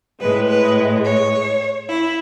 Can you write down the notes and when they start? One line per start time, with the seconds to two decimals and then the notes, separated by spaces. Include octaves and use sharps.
0.20 A2 G#3 B4
0.48 B4
1.05 C#5
1.89 E4